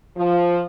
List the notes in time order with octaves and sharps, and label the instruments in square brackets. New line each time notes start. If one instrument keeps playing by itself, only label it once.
[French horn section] F3